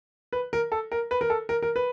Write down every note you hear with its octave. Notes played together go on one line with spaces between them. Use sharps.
B4
A#4
A4
A#4
B4
A#4
A4
A#4
A#4
B4